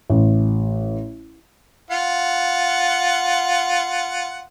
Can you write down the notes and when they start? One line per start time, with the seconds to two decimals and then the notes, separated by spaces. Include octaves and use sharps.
0.10 A1
1.91 F4 F#5